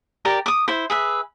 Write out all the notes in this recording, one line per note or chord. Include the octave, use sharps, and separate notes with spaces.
G4 A#4 D5 A#5
D6 D#6
E4 C5
G#4 B4 E5